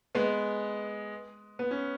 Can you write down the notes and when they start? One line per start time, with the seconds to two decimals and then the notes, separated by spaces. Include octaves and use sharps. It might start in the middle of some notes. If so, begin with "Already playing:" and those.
0.15 G#3 B3
1.59 B3
1.71 C#4